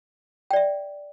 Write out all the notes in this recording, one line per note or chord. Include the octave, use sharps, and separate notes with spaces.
D5 E5 G5